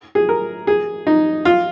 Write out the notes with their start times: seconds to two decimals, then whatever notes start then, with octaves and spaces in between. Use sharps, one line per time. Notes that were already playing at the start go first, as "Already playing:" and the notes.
0.15 G#4
0.29 A#4
0.67 G#4
1.07 D#4
1.45 F4